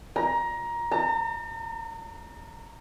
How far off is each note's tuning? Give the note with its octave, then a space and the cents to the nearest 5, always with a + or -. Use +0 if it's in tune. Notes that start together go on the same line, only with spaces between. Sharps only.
A#5 +15
A#5 -45